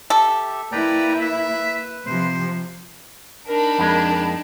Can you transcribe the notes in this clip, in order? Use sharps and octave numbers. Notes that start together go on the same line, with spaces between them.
G4 A4 E5
A#3 E4 B4 D5 G5 A#5
B4 E5
C3 F3 C5
D4 D#4 A#4 B5
F2 G#3